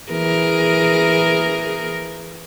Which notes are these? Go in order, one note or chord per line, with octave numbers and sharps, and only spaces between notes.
E3 G#4 A#4